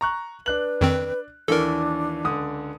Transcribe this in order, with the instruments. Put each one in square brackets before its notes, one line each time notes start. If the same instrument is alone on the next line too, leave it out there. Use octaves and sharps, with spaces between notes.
[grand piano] A#5 C#6 F#6
[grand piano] D4 F#6 F#7 [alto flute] B4
[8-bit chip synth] F2 D#3 C4
[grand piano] D#2 E3 [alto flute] D4 [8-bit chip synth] A4 A#4
[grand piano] C#2 D3 D#6